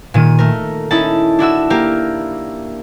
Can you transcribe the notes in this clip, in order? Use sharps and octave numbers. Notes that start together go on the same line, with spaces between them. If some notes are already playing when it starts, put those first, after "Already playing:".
A#2 D#3 D#7
A3 A#4
C#4 D#4 E4 A5
D4 E4 F#4 E6
A#3 G4 A#4